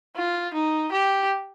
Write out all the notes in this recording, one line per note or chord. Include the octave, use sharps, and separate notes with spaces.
F4
D#4
G4